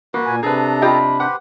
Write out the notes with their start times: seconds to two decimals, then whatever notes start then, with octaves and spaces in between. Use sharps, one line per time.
0.14 A#3 F#4 B4
0.26 A#2 G#5
0.43 C3 D4 G#4 A4 B4 A#5
0.82 F4 G4 D#5 B5
1.20 G4 B4 C5 F#5